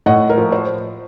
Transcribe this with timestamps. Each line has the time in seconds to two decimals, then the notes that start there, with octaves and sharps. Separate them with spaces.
0.06 A2 D#5 F#5
0.30 A#4
0.38 F3
0.52 C5